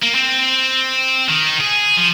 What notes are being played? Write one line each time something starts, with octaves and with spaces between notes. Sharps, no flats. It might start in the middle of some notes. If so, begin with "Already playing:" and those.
A#3
C4
D#3
G#4
F3